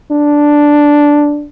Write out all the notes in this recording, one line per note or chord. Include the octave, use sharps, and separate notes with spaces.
D4